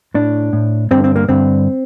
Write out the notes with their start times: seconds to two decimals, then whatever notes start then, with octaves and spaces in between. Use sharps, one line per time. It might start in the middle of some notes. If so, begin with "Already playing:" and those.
0.14 A2 D4
0.53 A2
0.91 G2 D3 C4
1.04 C4
1.16 A#3
1.28 G2 D3 C4